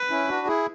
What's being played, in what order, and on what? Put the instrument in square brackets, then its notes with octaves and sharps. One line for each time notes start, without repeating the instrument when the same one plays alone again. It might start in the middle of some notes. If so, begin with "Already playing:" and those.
Already playing: [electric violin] B4
[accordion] C#4 E4
D4 F#4
E4 G#4